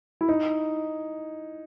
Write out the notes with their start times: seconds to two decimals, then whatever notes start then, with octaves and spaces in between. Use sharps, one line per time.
0.21 E4
0.29 D#4